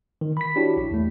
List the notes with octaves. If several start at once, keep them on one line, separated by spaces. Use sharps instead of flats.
D#3
B5 B6
D4 E4 F#4 G4 C#5
A#1
E2 A3